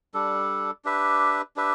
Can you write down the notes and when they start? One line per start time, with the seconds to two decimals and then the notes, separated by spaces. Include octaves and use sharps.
0.14 G3 D4 A4
0.85 D4 G4 B4 E5
1.56 D4 G4 B4 E5